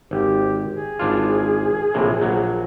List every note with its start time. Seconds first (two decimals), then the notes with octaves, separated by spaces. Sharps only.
0.11 G#1 G4
0.73 G#4
0.99 G#1 D4 F4
1.94 A#1 A2 C3
2.20 A#1 F#3